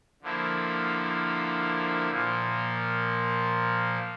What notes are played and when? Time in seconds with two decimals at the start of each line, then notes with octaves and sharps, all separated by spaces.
0.22 D3 F3 A#3 E4
2.10 A#2 F3 A#3